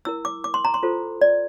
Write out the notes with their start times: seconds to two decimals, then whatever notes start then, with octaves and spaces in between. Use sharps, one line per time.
0.05 E4 A#4 E6
0.25 D6
0.44 D6
0.54 C6
0.65 A#5
0.74 C6
0.83 F4 A4 C5
1.21 D5